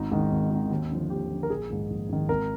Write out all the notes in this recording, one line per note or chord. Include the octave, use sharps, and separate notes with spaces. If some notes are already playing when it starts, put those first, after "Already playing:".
Already playing: G#1 D#4
G#2 D#3
G#1
G#2 D#3
D#2
D3 F3
D#2 G4
D3 F3
A#4
A#1 G#4
G#2 D#3
A#1
G#2 D#3
G#1 A#4